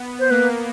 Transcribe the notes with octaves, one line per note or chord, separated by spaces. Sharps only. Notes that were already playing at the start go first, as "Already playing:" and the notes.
Already playing: B3
C5
A#3 B4